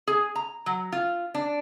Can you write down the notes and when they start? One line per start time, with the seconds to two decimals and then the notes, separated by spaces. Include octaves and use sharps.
0.07 G#4
0.35 A#5
0.66 F#3
0.92 F4
1.34 D4